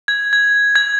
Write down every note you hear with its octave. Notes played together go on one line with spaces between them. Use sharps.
G#6
G#6
G#6